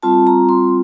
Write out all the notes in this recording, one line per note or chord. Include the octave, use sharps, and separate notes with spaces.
G3 C4 F4 A5
A#5
C6